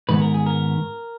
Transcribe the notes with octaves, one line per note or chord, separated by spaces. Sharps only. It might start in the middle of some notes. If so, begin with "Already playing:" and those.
G#2 D#3 G#3 B3 B4
A#4
G#4
A#4